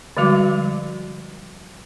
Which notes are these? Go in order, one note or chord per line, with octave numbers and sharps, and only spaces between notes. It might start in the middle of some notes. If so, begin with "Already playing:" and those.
D3 F3 G3 G#3 F#4 D6